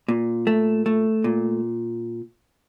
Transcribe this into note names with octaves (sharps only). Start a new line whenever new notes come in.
A#2
A3
A3
A#2